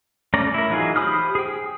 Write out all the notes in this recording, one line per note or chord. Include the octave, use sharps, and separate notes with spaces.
A3 C#4 D5 A#5
E4 A#4
E3 F#3 D#4 F4 G#4
G4 C5 B5 D#6 F6
G#4 G5